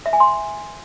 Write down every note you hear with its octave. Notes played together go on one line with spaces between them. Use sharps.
E5
G#5
C6